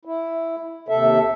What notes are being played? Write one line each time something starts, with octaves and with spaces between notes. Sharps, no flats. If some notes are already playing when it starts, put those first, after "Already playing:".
E4
D#2 C3 A4 E5